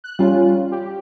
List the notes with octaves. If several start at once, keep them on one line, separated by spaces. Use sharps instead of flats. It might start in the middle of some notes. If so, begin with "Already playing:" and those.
F#6
G3 C#4 F4
G4